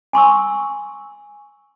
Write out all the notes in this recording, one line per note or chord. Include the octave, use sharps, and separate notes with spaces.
G#5 C6 C#6 E6